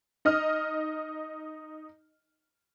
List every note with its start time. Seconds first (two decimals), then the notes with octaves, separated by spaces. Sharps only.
0.25 D#4 D#5 F6